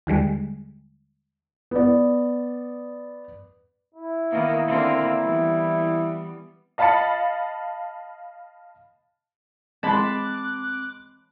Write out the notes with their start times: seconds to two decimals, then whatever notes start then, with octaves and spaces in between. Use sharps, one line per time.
0.07 D#2 D3 G3 G#3
1.71 B3 D5
3.95 E4
4.31 D#3 A#3 B3
4.67 D3 A#3 C4
5.22 E3 G3 B3
6.78 D#5 F5 A5 B5 A6 C#7
9.83 G#3 C4 A5 B5 C6 D6 F#6